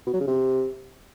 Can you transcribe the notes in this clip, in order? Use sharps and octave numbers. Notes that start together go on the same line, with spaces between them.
B2
F#3
C#3
C3